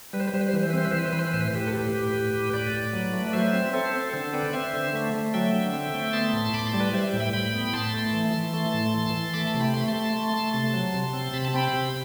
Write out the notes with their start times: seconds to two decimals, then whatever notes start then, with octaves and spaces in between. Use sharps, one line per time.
0.13 G3 B4
0.20 C5
0.28 B4
0.33 G3 C5
0.41 B4
0.48 C5
0.53 E3 B4
0.63 C5
0.70 B4
0.73 C4 C5
0.85 B4
0.91 E3 C5
0.99 B4
1.05 C5
1.12 E3 B4
1.19 C5
1.27 B4
1.33 A2 C5
1.41 B4
1.48 C5
1.54 A2 G4 B4
1.67 A4
1.73 A2 G4 B4
1.93 A2
2.13 A2
2.34 A2
2.53 A2 B4 D5
2.73 A2
2.93 F#3
3.13 A3
3.27 D5
3.33 F#3 C5 E5
3.53 C4
3.73 C4 A4 C5
3.94 C4
4.13 D3 A4 C5
4.33 C4 B4 D5
4.53 C4 C5 E5
4.73 D3
4.94 A3
5.14 A3
5.34 F#3 E5 G5
5.53 D3
5.73 C4
5.94 A3
6.13 B3 A5 C6
6.33 A2
6.53 A2 B5 D6
6.66 A5 C6
6.73 G3
6.80 B4 D5
6.93 G3 C5 E5
7.07 E5 G5
7.14 A2
7.20 G5 B5
7.33 A2 G5 B5
7.54 B3
7.73 A2 A5 C6
7.93 A3
8.13 E3
8.34 E3
8.53 A3
8.74 A2
8.94 E3
9.14 E3
9.33 A3 B5 D6
9.47 A5 C6
9.54 C3
9.60 G5 B5
9.74 A3 C6
9.81 B5
9.88 A5 C6
9.93 A3
10.14 A3
10.34 A3
10.53 C3 A5 C6
10.73 F#3
10.94 C3
11.13 C4
11.34 C3 B5
11.45 A5
11.54 C4 G5 B5
11.73 C3